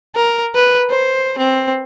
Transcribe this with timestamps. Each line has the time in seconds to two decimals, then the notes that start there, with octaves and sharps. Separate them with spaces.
0.15 A#4
0.55 B4
0.90 C5
1.38 C4